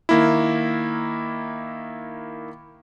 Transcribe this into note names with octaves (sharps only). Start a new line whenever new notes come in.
D#3 A#3 E4